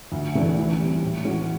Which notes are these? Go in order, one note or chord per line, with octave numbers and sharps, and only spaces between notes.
D2
C#3 E3 A3 D4
E3
G3 C4
A2
E3 G#3 C#4 F#4